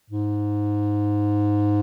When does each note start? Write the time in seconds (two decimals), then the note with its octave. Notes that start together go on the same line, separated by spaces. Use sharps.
0.10 G#2